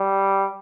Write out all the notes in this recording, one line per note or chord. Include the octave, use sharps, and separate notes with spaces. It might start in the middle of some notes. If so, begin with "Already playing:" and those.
Already playing: G3